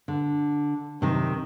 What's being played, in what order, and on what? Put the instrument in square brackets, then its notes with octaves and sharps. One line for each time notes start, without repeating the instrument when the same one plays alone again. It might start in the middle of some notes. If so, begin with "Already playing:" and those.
[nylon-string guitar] D3
F#2 C3 D#3